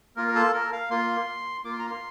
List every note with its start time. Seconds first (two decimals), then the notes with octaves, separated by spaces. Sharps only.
0.16 A#3 F4 A#4
0.28 A#4
0.35 A4
0.54 A#4
0.73 F5
0.90 A#3 F4 C6
1.64 A#3 F4 D6
1.73 C6
1.79 A#5
1.87 C6